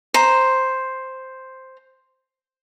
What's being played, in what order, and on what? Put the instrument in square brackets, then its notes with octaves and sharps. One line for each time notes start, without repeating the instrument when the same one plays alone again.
[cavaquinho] C5 A#5